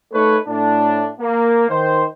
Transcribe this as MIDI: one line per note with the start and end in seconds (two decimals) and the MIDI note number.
0.13 0.37 57
0.13 0.37 63
0.13 0.37 69
0.13 0.37 71
0.13 0.37 73
0.47 1.10 45
0.47 1.10 62
1.20 1.65 58
1.70 2.06 51
1.70 2.06 72